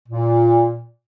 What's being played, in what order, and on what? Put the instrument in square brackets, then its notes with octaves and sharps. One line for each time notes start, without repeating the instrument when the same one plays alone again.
[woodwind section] A#2